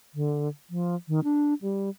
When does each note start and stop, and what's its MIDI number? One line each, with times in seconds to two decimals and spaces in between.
0.14 0.48 50
0.70 0.95 53
1.08 1.20 51
1.24 1.54 62
1.62 1.90 55